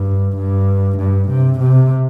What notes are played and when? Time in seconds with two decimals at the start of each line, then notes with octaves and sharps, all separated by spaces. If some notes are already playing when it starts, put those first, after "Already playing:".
Already playing: G2
0.37 G2
0.98 G2
1.29 C3
1.60 C3